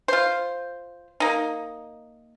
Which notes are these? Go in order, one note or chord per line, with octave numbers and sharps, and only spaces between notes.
F4 C5
A#3 D#4